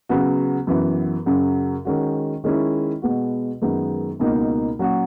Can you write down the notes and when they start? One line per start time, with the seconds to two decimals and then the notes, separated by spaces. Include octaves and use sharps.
0.09 C#3 F#3 B3 F#4
0.67 F#2 E3 B3 F#4
1.26 F#2 C#3 F#3
1.85 D#3 G#3 C#4 F#4
2.44 D#3 G#3 C#4 E4
3.02 B2 G#3 B3 F#4
3.62 F#2 D#3 G#3 B3 D#4
4.20 C#2 B2 A#3 D#4 F#4
4.79 A#2 F#3 C#4 F#4